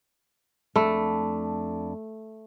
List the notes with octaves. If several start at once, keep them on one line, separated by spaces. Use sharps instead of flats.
F2 A3 D4 B5